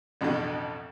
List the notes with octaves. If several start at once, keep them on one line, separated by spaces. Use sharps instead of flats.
A1 F2 B2 D3